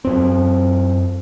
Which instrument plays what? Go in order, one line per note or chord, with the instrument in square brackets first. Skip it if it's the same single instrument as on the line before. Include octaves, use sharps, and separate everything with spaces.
[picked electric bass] F#2 C4